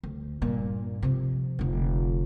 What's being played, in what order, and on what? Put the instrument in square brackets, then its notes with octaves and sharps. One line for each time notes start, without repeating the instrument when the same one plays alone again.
[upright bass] D2
G2 A#2
C3 F3
F1 D3